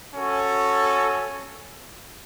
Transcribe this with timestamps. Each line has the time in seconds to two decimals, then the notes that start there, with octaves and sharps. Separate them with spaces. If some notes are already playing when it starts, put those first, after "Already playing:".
0.15 C#4 F#4 A4